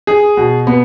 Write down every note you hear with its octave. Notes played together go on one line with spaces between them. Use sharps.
G#4
B2
B3